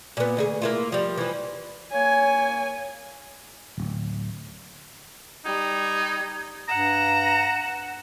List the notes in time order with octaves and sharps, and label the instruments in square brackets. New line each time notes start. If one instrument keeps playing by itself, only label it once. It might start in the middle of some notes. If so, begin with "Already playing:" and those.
[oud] A#2 B3
D2 D#4 G#4
A#3 E4 F4
F3 G3
E3 F3
[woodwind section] A#3 C#5 [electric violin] G#5
[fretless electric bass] D1
[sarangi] G3 [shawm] D#4 [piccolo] G#6
[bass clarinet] G2 [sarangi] F#5 [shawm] A#5 [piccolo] E7